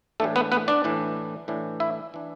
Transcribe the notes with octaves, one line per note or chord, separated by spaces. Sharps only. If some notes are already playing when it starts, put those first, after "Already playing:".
A2 E3 A3 D4 A4
B3 B4
B3 B4
D4 D5
A2 E3 D4
A2 E3 D4
E4 E5
E3 D4